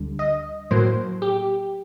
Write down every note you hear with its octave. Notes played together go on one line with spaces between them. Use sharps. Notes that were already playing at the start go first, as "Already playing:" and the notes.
Already playing: D2 D3 G3
D#5
A2 F#3 A#3 C5
G4